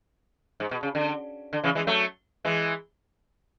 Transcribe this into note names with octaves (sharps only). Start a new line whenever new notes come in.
G#2
B2
C#3
D3
D3
C#3 E3
E3 G#3
F#3 A3
E3 G#3